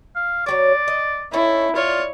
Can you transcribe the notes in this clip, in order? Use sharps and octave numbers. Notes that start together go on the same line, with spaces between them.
F5
F#3 G#3 C#5 D5
D#5
C#4 D#4 E4 A4
F4 C#5 D5